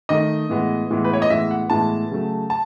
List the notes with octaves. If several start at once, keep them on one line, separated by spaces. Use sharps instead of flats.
D#3 A3 D#5
A2 E3 G#3 B3
A2 E3 G#3 B3
B4
C#5
D#5
A2 E3 G#3 B3 E5
F#5
A2 E3 G#3 B3 A5
C#3 F#3 A3
A5